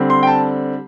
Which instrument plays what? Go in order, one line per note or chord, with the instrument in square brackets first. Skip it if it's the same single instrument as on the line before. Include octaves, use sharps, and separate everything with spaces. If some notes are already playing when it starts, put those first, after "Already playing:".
Already playing: [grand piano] D3 G3 C4
C6
G5
A5